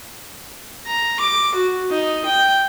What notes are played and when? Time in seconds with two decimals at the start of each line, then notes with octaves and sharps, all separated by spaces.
0.86 A#5
1.20 D6
1.55 F#4
1.90 D#4
2.26 G5